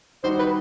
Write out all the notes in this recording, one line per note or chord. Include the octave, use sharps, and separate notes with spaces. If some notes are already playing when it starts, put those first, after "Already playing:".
D#3 G3 D#4 F#4 C5
B4